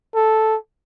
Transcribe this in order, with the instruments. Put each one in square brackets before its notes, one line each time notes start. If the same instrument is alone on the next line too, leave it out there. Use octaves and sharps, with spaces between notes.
[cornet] A4